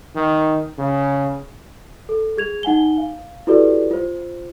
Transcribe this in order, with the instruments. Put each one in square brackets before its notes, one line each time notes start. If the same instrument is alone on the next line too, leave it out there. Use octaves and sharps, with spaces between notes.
[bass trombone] D#3
C#3
[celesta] A4
G#4 G#6 F7
D#4 F#5 G#5 G7
F5
E4 F#4 G4 A4 B4 D5
F4 C5